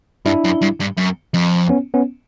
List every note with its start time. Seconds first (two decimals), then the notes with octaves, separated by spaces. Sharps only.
0.26 G2 D4 E4
0.44 F#2
0.61 G2
0.80 G2
0.97 F#2
1.34 F2
1.69 B3 C#4
1.94 B3 C#4